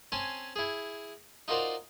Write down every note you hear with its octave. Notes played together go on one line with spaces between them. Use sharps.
C4 C#4 G#5 A5 C6
E4 G#4
D#4 F4 F#4 A#4 C5 D5